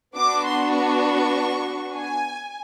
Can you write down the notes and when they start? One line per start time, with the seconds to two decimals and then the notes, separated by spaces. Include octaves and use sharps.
0.16 B3 D4 F#4 D6
0.45 C6
0.75 C#6
1.94 G#5